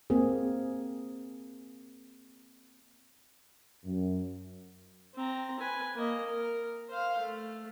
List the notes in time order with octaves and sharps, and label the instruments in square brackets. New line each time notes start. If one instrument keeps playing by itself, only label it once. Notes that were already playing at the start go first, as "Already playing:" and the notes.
[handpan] A#3 C4 G#4
[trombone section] F#2
[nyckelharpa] C4 A#5
B4 G#5
A#3 D#5
A#4
C5 F5
A3